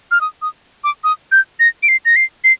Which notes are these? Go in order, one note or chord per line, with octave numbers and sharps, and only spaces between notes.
F6
D#6
D#6
D6
D#6
G6
A#6
D7
C7
A#6
C7
C7